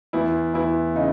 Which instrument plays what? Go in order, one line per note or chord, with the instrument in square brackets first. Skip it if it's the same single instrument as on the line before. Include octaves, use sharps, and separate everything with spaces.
[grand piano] E2 E4
E2 E4
C#3 D#4